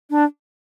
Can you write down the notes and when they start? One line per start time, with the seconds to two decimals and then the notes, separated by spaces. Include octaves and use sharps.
0.10 D4